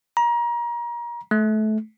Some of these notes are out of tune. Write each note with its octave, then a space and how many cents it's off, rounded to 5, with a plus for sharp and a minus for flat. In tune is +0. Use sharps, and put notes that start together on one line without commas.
A#5 +30
A3 -25